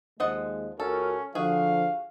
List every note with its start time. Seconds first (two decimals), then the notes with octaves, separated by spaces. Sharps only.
0.20 D#2 F3 G#3 D#5 F#5
0.80 C#2 C#4 F#4 A4 A#4
1.35 D3 F3 F#4 G#4 F5